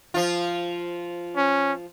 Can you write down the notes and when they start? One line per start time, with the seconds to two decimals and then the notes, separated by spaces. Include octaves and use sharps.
0.14 F3 F4
1.37 C#4